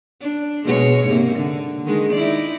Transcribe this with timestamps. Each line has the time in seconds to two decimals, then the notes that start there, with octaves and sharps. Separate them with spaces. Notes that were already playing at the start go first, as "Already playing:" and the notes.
0.21 D4
0.64 B2 G#3 C#5
1.05 G#2 C3 A#3
1.36 D3
1.83 D3 D#3 G#3
2.13 D#4 E4 D5